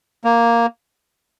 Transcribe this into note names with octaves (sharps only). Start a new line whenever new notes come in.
A#3